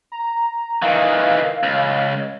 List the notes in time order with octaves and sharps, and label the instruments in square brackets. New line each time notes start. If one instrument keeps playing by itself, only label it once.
[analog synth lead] A#5
[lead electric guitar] D#3 E3 [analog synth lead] F5
[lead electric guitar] C#2